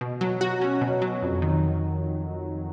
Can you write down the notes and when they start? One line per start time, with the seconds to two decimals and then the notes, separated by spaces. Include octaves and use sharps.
0.01 B2
0.21 F#3
0.41 F#4
0.61 C#4
0.81 B2
1.02 F#3
1.22 F2
1.42 D#3